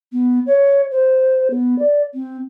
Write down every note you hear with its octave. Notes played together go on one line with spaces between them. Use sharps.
B3
C#5
C5
B3
D5
C4